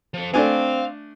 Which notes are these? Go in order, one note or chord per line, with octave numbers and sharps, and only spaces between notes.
F3 A4
A3 C4 D4 F5 G#5